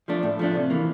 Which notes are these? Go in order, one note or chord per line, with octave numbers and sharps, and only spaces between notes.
F3 A3 D4
A2
F3 A3 D4
C3
E3 A#3